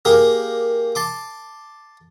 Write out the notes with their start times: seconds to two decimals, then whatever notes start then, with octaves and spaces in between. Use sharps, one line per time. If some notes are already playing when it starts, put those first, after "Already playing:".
0.05 A#3 G4 G#4 A#4
0.95 A5 C6 D6